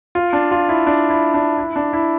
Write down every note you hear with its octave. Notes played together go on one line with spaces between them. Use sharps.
F4
D4
F4
E4
D4
E4
D4
E4
D4
E4